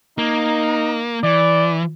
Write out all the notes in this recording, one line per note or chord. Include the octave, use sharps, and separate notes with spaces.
A#3 D#4
E3 D5